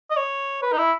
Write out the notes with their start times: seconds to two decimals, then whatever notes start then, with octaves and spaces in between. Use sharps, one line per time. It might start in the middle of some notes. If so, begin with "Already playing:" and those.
0.10 D#5
0.17 C#5
0.63 B4
0.72 D#4
0.78 E4